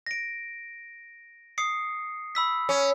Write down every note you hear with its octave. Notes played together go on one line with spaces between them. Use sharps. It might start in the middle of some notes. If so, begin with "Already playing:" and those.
A#6 D7
D#6 C7 C#7
B5 E6 B6
C#4